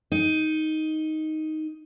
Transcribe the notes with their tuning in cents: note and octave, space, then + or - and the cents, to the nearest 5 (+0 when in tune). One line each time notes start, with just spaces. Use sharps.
D#4 +5